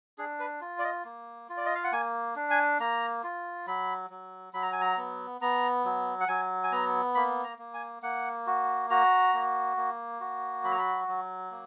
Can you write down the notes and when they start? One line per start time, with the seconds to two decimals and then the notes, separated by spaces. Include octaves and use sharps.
0.18 D4 G#4
0.39 B4
0.61 F4
0.79 D5
0.84 D#5
1.05 A#3
1.49 F4
1.57 D5
1.66 D#5
1.75 F5
1.84 F#5
1.92 A#3 G#5
2.36 D4
2.50 G#5
2.80 A#3 A#5
3.24 F4
3.67 F#3 B5
4.10 F#3
4.53 F#3 B5
4.62 A#5
4.72 G#5
4.81 A#5
4.97 B3
5.41 B3 A#5
5.85 F#3
6.20 F#5
6.28 F#3 G#5
6.63 G#5
6.72 B3 A#5
7.15 A#3 B5
7.44 A#5
7.58 A#3
7.74 G#5
8.03 A#3 F#5
8.47 F#4
8.90 F#4 A#5
9.34 A#3
9.77 A#3
10.20 F#4
10.64 F#3 B5
10.71 A#5
10.78 B5
11.08 F#3
11.51 A#3